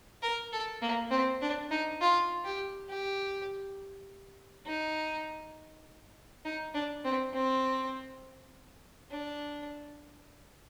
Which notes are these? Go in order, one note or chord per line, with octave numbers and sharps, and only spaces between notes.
A#4
A4
A#3
C4
D4
D#4
F4
G4
G4
D#4
D#4
D4
C4
C4
D4